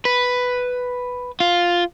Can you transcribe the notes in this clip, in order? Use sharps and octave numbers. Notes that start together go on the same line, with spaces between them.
B4
F4